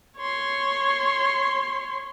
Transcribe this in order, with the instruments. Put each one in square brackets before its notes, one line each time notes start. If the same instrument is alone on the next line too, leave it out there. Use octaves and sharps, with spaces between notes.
[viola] C#5 C6